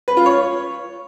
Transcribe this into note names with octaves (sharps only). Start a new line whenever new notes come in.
B4
F4
C#5